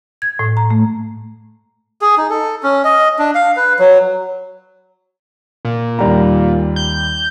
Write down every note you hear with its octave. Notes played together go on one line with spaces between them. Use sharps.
G#6
A2
A#5
A3
G#4
D#4
A4
C#4
D#5
D4
F5
B4
F#3
A#2
D#2 G3 A#5
G6